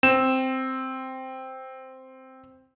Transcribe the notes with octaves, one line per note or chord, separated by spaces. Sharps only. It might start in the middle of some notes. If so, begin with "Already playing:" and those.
C4 E7